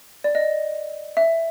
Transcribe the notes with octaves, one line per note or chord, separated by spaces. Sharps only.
D5
D#5
E5